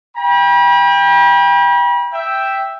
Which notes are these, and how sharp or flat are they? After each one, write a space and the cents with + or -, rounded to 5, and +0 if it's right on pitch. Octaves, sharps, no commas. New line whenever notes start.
G5 +30 B5 -40
E5 +0 G5 +0